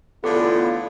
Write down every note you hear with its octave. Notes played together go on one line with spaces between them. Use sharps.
E2 A2 D3 B3 F4 A4 D6